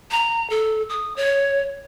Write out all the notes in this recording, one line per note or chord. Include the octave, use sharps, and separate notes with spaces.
A#5
A4
D#6
C#5